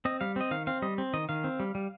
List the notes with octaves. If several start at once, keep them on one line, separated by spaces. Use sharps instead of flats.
C4 D#5
G3 F5
C4 D#5
D#3 F5
C4 F5
G3 D#5
C4
D#3 D#5
D#3 F5
C4
G3
G3